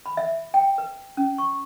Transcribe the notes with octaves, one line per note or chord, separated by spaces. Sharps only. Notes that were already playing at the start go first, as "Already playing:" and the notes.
B5
E5
G5
B4
C#4
C#6